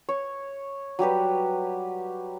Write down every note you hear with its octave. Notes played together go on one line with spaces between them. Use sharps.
C#5
F#3 G3 G4 B4